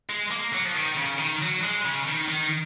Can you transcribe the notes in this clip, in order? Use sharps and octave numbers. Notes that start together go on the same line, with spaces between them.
G#3
A#3
F#3
F3
D#3
C#3
D#3
F#3
G#3
C#3
D#3
D#3